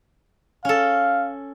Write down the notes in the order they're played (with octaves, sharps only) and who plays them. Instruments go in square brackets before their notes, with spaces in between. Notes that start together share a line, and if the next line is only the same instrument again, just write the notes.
[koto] C#4 A4 [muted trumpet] F5